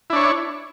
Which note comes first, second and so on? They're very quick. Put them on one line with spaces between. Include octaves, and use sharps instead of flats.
E4 D4 C#5